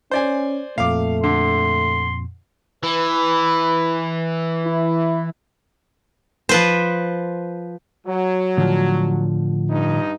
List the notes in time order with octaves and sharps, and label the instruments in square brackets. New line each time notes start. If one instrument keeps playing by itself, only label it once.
[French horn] C#4 [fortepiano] C5 D5 G#5
[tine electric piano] F2 A#2 [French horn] A3 [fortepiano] F5 D6
[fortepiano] D3 [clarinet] C6
[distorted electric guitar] E3 [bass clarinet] B4
[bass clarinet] E4
[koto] F3 B4 C5
[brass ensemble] F#3
[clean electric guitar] A2 D3 F3
[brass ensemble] G2 D#4